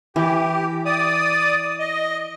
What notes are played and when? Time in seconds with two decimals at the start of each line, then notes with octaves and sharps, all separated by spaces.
0.16 E3 G4
0.86 D5 D#6
1.80 D#5